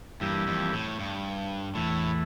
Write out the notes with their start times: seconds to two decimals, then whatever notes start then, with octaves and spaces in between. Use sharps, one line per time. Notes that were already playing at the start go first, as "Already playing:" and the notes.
0.21 G2 E3 G3 A#3 E4 G4
0.47 F2
0.72 A2
0.99 G2
1.75 E2 A2 E3 A3